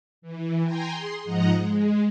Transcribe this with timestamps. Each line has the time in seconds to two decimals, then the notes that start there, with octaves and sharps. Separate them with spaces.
0.22 E3
0.63 G5 G#5 A#5 C6
0.92 G#4 C6
1.24 G#2 F3 D#5 F#5 A#5
1.57 G#3